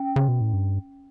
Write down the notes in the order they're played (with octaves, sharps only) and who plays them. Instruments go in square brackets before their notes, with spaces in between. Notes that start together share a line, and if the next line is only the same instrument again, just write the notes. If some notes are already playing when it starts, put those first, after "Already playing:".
Already playing: [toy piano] C#4 G5
[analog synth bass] C#3
B2
A2
G2